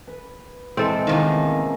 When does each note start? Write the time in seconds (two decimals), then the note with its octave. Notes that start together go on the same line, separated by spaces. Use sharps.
0.07 B4
0.77 C3 E3 G#3 C4 A4
1.07 A2 C3 D#3 F3 A#3 C#4